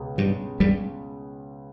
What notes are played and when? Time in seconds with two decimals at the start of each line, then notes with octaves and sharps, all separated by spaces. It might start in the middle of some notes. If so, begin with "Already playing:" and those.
Already playing: C#2 B2 G#3 B3
0.18 G2 G3
0.60 G2 G3